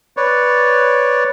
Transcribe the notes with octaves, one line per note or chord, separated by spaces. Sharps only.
B4 C#5 D5